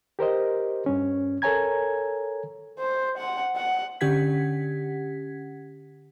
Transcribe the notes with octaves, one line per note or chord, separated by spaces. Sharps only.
G4 A#4 C5 D#5
G2 C#4
A4 A#4 C#5 G#5 A#5 G#6
C5
F#5
F#5
D3 C#4 G4 F#5 G#6 B6